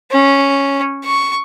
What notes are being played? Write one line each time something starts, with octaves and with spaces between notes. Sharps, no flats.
C#4
C#6